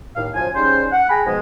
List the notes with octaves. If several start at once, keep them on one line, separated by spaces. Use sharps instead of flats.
D#2 A2 F5
F#2 F3 C5 G#5
C#3 G3 C#4 D#4 C5
F#5
G#4 G5 G#5 A#5 B5
G#2 B2 F3 G#3